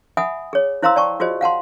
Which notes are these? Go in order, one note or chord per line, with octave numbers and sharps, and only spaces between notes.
E5 F#5 G#5 B5 D#6
G#4 C#5
E4 C5 F5 A#5 C6 E6
D5 G5 A5 C#6
F4 F#4 G#4 C5 D#5
F5 F#5 A5 C6